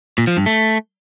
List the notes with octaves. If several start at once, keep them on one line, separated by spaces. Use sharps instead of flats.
A#2
F3
G2
A3